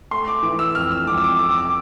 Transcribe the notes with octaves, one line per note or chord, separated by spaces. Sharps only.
A3 C6
D6
E3 D6
E6
F2 F6
E6
F2 D6
E6
D6
C4 D6
E6
D6